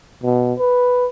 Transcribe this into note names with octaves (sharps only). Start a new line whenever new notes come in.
B2
B4